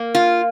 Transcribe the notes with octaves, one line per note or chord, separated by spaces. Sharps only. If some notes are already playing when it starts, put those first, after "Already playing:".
Already playing: A#3
F4